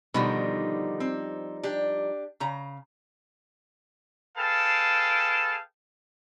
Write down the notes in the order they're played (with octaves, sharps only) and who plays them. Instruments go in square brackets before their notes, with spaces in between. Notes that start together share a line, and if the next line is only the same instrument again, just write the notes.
[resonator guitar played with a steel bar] B2 D3 D#3 [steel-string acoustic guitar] F3 G3 D#4
[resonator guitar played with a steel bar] C4
D4 G4
C#3 A#5
[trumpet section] G#4 A4 B4 F5 G5 A5